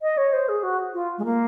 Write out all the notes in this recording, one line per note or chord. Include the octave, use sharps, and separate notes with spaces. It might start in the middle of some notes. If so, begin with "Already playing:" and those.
D#5
C#5
C5
G#4
F#4
F4
G#3
A#3